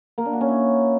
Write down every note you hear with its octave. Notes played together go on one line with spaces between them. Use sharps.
A#3
D4
F#4
C#4
E4